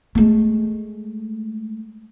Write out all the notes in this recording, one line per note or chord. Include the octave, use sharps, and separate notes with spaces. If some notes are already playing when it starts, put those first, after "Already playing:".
G#3 A3